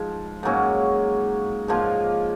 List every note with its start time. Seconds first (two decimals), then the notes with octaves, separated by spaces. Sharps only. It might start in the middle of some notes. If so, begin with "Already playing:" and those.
Already playing: G#2 F3
0.43 G#2 F#3 A#3 C#4
1.68 G#2 F3 A#3 F4